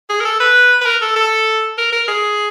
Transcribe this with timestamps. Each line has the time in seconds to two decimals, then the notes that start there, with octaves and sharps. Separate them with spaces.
0.09 G#4
0.20 A#4
0.25 A4
0.40 B4
0.81 B4
0.86 A#4
1.02 A4
1.16 A4
1.78 A#4
1.92 A#4
2.08 G#4